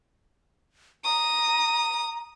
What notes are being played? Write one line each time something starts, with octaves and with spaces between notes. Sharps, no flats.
A#5 D#6